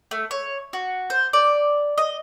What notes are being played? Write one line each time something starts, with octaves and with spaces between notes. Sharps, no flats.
A3
C#5
F#4
C5
D5
D#5